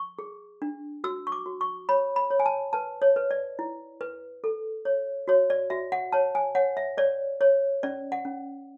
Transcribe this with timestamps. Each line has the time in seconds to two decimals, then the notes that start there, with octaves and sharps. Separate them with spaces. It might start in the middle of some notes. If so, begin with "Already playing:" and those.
Already playing: C#6
0.19 G#4
0.62 D4
1.04 F#4 E6
1.27 C#6
1.32 D6
1.46 F#4
1.61 C#6
1.89 C#5 B5
2.16 B5
2.31 C#5
2.40 G#5
2.46 A5
2.73 B4 A5
3.02 C#5
3.16 B4
3.31 D5
3.59 E4
4.01 B4
4.44 A4
4.85 C#5
5.28 F#4 C#5
5.50 D5
5.70 F#4 E5
5.92 F#5
6.12 C#5 A5
6.35 G#5
6.55 C#5 F#5
6.77 E5
6.97 C#5 D5
7.41 C#5
7.83 C#4 D5
8.12 F#5
8.25 C#4